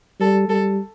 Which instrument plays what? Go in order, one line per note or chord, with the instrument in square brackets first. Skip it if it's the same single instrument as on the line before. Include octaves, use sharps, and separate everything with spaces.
[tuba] G3 [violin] A4
[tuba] G3 [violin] A4